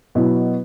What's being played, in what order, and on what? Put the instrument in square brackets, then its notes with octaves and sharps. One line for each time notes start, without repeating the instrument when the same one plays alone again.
[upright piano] B2 F#3 B3 E4